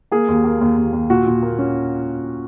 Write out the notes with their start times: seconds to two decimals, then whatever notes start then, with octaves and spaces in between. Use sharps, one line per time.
0.12 A#3 G#4
0.28 D#2
0.44 A#3
0.61 D#2
0.77 D#2
0.93 D#2
1.10 A#2 F#4
1.26 A#2
1.43 A#3
1.59 C#4